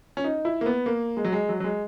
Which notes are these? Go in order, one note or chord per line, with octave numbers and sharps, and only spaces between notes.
C#4
D#4
E4
A#3
B3
A#3
G#3
F#3
G#3
F#3
F#3
G#3